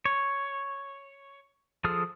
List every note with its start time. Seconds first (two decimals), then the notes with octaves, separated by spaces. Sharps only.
0.05 C#5
1.84 F3 G#4 A4 D#6 F6